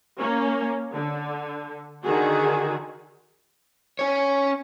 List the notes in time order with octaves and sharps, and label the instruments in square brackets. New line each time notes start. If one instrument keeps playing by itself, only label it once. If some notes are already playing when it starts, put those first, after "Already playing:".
[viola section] A#3 C#4
D3
D3 D#3 F#4 G#4
[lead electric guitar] C#4 C#5